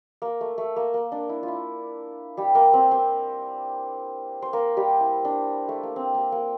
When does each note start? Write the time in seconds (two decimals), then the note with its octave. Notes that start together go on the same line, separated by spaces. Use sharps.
0.22 A#3
0.41 A3
0.58 A3
0.76 A#3
0.94 A#3
1.12 D4
1.29 E4
1.43 F4
1.48 E4
2.37 G3 G4
2.55 A#3 A#4
2.73 C4 C5
2.91 C4 C5
4.42 C5
4.53 A#3 A#4
4.77 G3 G4
5.01 E4
5.25 D4
5.69 A3
5.83 A#3
5.96 C4
6.15 A#3
6.32 A#3